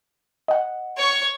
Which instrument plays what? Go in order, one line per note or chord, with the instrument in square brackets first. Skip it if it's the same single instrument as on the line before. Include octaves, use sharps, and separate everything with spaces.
[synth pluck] D#5 F#5
[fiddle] C#5 C#6